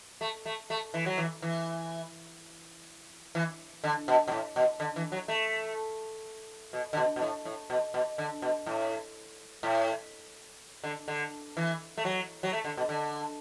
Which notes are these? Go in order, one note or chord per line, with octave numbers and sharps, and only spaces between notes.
A3
A3
A3
E3
F#3
E3
E3
E3
D3
B2
B2
A2
B2
D3
E3
F#3
A3
B2
D3
B2
B2
A2
A2
B2
B2
D3
B2
A2
A2
D3
D3
E3
A3
F#3
F#3
A3
D3
B2
D3